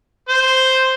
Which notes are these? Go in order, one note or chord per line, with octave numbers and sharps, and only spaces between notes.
C5